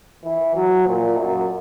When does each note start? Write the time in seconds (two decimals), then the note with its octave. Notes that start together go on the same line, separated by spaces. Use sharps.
0.24 E3
0.56 F#3
0.87 A#2
1.17 F#2